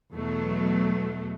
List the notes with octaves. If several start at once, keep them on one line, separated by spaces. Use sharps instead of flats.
E2 B2 F#3 A3